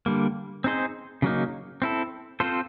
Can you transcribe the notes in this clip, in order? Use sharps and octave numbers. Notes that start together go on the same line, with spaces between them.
D3 G3 A#3
C4 D#4 G#4 C5
C#3 F#3 A#3 D#4
C4 E4 A4
C4 F4 A4 C5